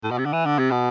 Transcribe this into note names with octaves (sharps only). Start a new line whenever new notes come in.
A2
B2
C3
D3
E3
D3
C3
B2